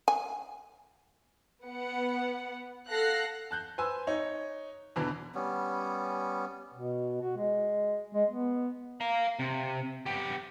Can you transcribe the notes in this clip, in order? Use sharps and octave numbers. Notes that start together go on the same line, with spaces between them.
G#5
B3 F#5
A4 F5 F#5 F#6 A#6 C7
A5 F#6 G6
B4 C5 G#5 E6
D#4 C#5
E2 B2 D3 E3
G3 B3 C#4
B2
F#4
G#3
G#3
B3
F5 A#5
C3
B3 G4